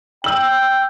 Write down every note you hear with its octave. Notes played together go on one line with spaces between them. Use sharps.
G5 E6 F#7